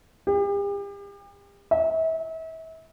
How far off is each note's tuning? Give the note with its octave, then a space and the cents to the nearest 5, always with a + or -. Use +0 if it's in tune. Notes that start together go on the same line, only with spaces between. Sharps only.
G4 +40
E5 -35